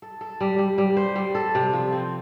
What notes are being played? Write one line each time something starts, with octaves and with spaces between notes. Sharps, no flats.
A4
A4
G3
G3
G3
C5
G3
A4
C3
F3
C4